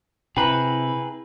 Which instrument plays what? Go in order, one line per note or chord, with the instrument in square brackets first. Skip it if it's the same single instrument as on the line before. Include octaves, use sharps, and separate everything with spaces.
[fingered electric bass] C3 [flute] E4 [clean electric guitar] G#4 B4 [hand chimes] G5 A#5